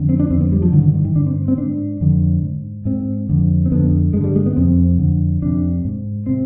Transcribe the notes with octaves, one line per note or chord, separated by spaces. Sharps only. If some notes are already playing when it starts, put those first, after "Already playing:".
Already playing: F2 D3
C4
D4
F2 D3 C4
B3
G3
F3
G2 D3 D#3
D3
D#3
D#3
G2 D3 D4
C4
C4
G#2 D4
F2 D3
G#2
G#2 C4
F2 D3
C4
F2 D3 B3
G2 D3 G#3
G3
G#3
B3
F2 C3 C4
F2 D3
F2 C3 D4
G#2
C3 C4